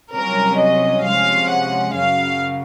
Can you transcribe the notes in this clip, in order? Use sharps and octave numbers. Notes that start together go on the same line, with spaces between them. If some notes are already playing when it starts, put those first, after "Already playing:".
C2 C3 F#3 C#4 A#4
D#5
C3 F3 G#3 C#4 F5
F#5
F#2 C#3 F#3 F5